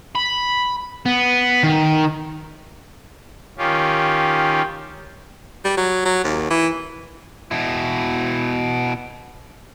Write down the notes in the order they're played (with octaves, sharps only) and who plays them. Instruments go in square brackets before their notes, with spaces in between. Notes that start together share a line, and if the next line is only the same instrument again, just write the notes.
[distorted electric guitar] B5
B3
D#3
[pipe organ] D#3 C#4 F4 G4
[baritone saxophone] G3
F#3
F#3
D#2
E3
[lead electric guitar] B2 E4